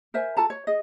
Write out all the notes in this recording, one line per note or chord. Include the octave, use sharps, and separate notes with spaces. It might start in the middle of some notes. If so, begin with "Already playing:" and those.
A#4 C5 E5 G#5
F4 A4 A5 A#5
C#5
G#4 D#5